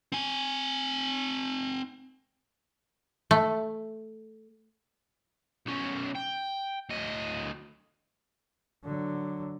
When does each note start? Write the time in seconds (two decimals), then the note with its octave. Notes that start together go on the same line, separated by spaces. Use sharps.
0.12 C4 G#5
3.31 A3
5.66 B1 C#4
6.15 G5
6.89 D2 D#5
8.84 D3 F#3